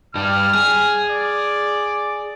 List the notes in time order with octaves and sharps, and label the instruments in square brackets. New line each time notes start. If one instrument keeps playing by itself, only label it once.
[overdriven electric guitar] G2 G3 [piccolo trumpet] F6
[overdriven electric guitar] G#4
[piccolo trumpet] D5